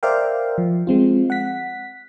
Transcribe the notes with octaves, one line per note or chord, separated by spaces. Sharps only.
A#4 C5 D5 E5 F5 G5
F3
G#3 C4 F4
F#5 B6